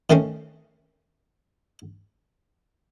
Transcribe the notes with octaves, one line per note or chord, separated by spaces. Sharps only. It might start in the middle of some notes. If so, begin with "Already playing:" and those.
D#3 A3 C4 C#4